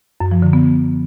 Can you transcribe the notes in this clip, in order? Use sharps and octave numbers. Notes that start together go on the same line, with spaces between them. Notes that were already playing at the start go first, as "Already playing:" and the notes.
F#2
F3
D3
B3